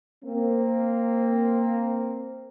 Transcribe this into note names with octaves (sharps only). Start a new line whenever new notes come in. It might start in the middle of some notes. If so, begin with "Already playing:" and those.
A#3 C4